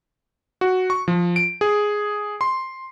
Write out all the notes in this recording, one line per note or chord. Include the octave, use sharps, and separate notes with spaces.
F#4
C#6
F3
D7
G#4
C6